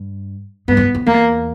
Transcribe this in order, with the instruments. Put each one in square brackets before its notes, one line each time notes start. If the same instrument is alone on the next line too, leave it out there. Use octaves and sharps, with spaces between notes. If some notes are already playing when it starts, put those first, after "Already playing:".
Already playing: [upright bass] G2
[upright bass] G2 [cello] B3
[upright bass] F2
F#2
F2
[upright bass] E2 [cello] A#3